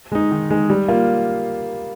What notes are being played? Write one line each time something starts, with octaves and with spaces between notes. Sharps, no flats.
G#3 D#4
D#3
G#3 D#4
G3
A#3 F4